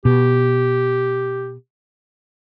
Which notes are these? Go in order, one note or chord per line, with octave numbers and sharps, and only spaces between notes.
B2 G4